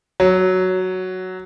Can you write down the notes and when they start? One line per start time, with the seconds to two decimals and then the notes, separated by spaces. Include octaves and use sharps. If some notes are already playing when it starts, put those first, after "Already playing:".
0.20 F#3